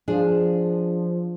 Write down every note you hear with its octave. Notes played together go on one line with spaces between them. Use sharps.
F3 D4 G#4